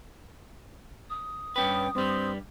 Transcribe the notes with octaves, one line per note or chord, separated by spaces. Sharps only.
D#6
G2 C#4 B4 G5
G2 G3 C4